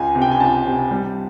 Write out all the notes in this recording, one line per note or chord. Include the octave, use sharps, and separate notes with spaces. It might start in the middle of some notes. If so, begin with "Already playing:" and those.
Already playing: C#2 G#5
C3
G5
G#5
C#2 A5
C3
G3